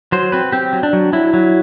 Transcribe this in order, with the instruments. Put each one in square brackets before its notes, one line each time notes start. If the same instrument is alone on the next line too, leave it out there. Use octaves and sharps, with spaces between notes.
[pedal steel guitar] F#3 C5
C4 B4
C4 G4
F#3
D4
F#3
F#3 E4
F#3